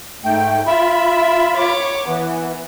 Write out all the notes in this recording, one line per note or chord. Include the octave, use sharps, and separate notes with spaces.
G#2 A3 G5
F4 E5 B5
C#5 D6
E3 B3